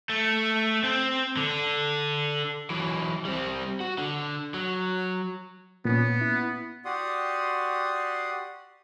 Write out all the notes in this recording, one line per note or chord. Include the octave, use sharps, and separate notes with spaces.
A3
C4
D3
E3 F#3
G3 C4
F#4
D3
F#3
A#2 A#3 B3 C#4
E4
F#4 G4 D5 F#5 C6 D#6